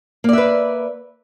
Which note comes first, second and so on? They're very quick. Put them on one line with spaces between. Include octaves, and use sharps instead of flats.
A#3 D5 E5 B4